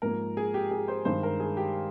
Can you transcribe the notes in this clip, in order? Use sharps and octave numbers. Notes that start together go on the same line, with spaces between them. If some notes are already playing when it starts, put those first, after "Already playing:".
G#2 F3 A#3 A#4
G#4
G4
G#4
C5
G2 D#3 G#3 C5
A#4
G#4
G4